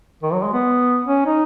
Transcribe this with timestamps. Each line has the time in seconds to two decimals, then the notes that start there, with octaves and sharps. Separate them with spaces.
0.23 D#3
0.33 F#3
0.43 G#3
0.53 B3
1.05 C#4
1.26 D#4